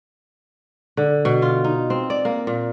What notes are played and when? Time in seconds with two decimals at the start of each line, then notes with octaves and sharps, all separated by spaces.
0.97 D3
1.25 B2
1.42 F4
1.64 D#4
1.90 C4
2.10 D5
2.25 A#3
2.47 A#2